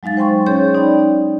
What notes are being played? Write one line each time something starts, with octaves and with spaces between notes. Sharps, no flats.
F#3 G#3 D#4 F5 A6
C5 G5 C6 C#6
C#4 G#4 C#5 C6 G6
D#4 D5 G5 B5